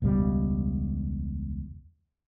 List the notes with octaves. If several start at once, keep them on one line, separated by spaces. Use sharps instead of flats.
E1 C#2 B2 G3